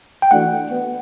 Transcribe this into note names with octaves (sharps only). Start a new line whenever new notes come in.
G5
E3 A3 D4 F#4 F#5
B3